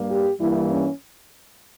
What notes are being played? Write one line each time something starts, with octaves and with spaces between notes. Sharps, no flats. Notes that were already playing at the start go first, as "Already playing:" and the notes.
Already playing: G2 G3 A#3
G4
G2 E3 G3 A#3 E4
C#4